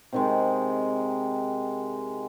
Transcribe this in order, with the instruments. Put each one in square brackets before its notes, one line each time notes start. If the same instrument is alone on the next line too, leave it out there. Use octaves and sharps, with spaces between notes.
[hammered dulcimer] C3 D#3 G#3